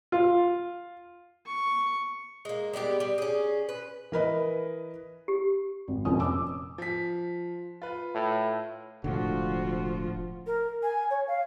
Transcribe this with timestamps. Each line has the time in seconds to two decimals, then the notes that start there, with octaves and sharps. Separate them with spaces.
0.12 F4
1.47 C#6
2.45 G#3 A#3
2.73 G3 G#3 B3 G4
3.00 G3
3.18 C#4 G#4
3.69 B4
4.12 E3 A#4 B4 D#5
5.28 G4
5.88 G#1
6.05 F1 A#2 C#4 D#6
6.20 D6 E6
6.78 F3 B6
7.82 F4 B4
8.15 A2
9.04 E1 A2 D3 F3 F4 F#4
10.47 A#4
10.83 G#5
11.10 C#5
11.28 F5